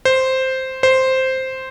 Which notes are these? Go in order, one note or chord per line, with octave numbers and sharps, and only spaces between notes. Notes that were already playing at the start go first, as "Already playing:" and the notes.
C5
C5